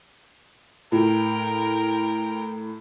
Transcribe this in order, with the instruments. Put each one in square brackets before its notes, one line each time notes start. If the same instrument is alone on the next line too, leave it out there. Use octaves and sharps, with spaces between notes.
[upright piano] A2 [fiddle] A#4 G5